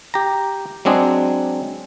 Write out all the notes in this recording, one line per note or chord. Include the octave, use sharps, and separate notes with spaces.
G4 A#5
F#3 G#3 C4 D4 G#4